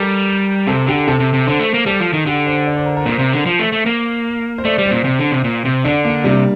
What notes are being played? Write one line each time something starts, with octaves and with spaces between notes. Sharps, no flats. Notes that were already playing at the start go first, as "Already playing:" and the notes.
Already playing: G3 A4 A#4
C3 A4
D3 G4
C3 A4
C3
C3
D3 C5
A3
A#3
G3 A4
F3
D#3
D3 G4
C5
D5
C5
A#4
A#4
A#2 C5
C3
D3
F3
A3
A3
A#3
C5
A3 D5
G3
C5
A#2
C3
D3
C3
A#2
C3
D3 D4
A#3
C3 G3